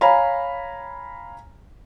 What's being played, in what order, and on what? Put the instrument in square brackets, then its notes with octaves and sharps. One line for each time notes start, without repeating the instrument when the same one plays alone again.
[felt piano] C#5 F5 G#5 A#5 B5